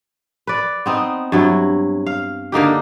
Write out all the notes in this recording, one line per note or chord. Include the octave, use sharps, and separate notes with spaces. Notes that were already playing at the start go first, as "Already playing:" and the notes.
B4 D5
B3 C4 D#4
G2 F#3 E4
F5
D3 A#3 D#4 G4